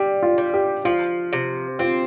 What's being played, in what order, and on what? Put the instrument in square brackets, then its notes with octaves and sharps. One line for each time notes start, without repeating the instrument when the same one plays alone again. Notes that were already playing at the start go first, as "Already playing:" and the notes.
Already playing: [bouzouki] G3 [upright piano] G4
[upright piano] F4
[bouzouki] G3
[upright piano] G4
[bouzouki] F3 [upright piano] F4
[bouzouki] C3
[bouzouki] C4 [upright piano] F4